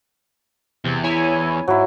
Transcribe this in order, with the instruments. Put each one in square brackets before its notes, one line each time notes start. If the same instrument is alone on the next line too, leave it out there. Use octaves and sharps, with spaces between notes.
[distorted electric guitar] E2 [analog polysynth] C3
[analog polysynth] E4 C#5 G#5
[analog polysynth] G#2 [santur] F#3 E4